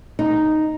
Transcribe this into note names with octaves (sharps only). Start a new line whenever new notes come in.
D#4